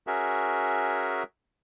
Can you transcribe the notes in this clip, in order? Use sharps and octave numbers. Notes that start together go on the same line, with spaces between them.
C#4 F#4 G#4 A#4 E5